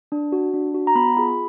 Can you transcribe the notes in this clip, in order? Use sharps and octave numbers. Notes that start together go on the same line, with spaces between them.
D4
F#4
D4
F#4
A#5
B3 B5
F4 G#4 B5